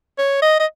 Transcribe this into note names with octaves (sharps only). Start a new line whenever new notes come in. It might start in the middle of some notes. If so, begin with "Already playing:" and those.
C#5
D#5
D#5